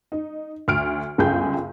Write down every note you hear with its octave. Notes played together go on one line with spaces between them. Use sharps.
D#4
D2 F6 D7
G1 C#2 F#2 G#4 G5 G6